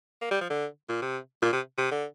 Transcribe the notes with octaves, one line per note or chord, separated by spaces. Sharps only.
A#3
G3
F3
D3
A#2
C3
A#2
C3
C3
D3